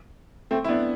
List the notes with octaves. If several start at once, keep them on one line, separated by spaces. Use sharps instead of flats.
A3 C4
E4
B3 D4